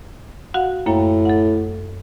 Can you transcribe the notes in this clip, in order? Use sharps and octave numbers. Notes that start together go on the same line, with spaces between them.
F#4 F5 F#5
F#2 A2 A#3 G5
A4 F#5